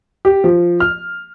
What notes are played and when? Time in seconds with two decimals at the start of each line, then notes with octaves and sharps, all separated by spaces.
0.25 G4
0.44 F3
0.80 F6